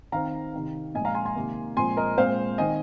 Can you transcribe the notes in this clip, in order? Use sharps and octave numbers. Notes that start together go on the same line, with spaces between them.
D#3 C4 F5 A#5
C3 D#3 C4
A#2 F3 G#3 D#5 G#5
F5 A#5
G#5 C6
G#5 C6
C3 D#3 A#3
A#2 F3 G#3 C4 G#5 C6
A#4 D#5
A#2 G#3 C4 C5 F5
D#3 C4 D#5 G#5